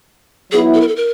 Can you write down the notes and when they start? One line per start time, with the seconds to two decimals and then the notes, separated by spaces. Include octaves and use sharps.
0.51 F#3 B3 E4 G#4
0.74 A4
0.81 A#4
0.88 A4
0.96 A#4